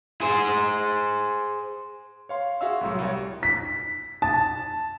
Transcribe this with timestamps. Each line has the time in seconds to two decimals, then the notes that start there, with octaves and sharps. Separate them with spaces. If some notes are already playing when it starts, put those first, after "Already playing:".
0.21 G#4 C5
2.29 C#5 F5 C6
2.61 F#4 G#4 E5 F5 C6 E6
2.81 C2 A2 F#3
2.99 C2 G3 C#5
3.43 B6
4.22 A5